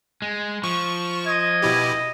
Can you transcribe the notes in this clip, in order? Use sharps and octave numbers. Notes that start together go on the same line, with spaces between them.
G#3
F3 C#6
D#5 G#6
B2 E4 G4